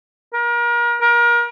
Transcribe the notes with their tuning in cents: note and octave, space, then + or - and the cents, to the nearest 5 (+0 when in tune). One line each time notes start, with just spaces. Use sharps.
A#4 +35
A#4 +30